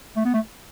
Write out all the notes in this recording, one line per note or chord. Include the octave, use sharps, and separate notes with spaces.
A3
B3
A3